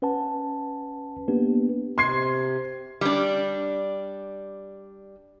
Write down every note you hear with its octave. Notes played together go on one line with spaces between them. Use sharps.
C#4 B4 F#5 G#5 A5
A#3 B3 D4 G4 B4
C3 C6 G#6 C7
G3 D4